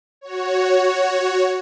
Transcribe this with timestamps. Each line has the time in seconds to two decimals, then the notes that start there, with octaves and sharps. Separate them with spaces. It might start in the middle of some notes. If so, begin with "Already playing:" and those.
0.21 F#4 C#5